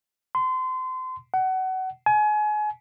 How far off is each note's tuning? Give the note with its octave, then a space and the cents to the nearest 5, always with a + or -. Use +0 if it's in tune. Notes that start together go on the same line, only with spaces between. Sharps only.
C6 -30
F#5 +25
G#5 +30